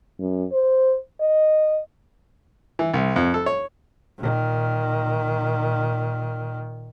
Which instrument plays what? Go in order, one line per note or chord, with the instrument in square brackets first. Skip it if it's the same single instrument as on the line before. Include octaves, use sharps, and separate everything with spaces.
[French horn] F#2
C5
D#5
[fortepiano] E3
C2
F2
A4
C#5
[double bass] A#2 D#3